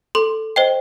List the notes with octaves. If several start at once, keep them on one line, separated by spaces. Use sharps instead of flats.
A4 C6
C5 D#5 G5